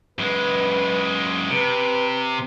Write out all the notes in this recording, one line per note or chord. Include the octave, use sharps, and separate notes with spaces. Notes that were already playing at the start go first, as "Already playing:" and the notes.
F#2 G#3 B4
C3 B4